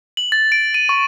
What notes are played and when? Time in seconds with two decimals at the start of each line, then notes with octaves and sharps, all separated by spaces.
0.17 F#7
0.32 A6
0.52 D7
0.74 D#7
0.89 C#6